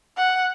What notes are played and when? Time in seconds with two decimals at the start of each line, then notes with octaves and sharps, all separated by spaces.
0.17 F#5